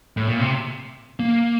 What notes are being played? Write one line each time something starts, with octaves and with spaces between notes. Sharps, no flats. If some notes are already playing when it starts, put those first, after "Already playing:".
A2
A#2
C3
A#3